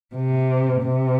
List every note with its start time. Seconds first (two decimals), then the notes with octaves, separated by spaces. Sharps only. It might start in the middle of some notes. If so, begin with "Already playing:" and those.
0.15 C3
0.82 C3